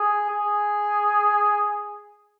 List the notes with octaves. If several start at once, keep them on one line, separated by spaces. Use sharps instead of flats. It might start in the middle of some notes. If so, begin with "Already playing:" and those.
Already playing: G#4
G#4